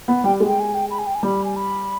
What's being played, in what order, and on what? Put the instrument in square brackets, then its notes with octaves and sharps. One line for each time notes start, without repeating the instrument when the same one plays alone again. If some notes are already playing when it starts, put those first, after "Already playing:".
[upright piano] B3
[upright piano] G3 [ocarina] G5
[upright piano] G#3
[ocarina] G5
G#5
G5
B5
G#5
G5
G#5
[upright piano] G3 [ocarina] B5
[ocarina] G#5
B5